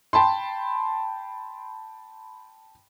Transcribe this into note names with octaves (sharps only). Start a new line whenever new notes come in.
G5 A5 B5 C6